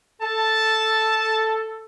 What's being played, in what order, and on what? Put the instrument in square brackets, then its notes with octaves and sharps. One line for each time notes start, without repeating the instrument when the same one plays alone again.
[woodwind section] A4 [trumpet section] A5